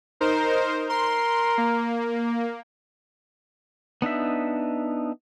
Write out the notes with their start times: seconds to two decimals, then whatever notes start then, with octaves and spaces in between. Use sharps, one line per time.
0.21 D#4 A#4 C5
0.89 A#4 C6
1.58 A#3
4.02 B3 D4 D#4 E5